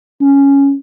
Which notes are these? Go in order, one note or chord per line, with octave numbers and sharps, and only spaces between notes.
C#4